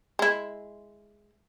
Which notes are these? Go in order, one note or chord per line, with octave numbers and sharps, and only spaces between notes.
G#3 E4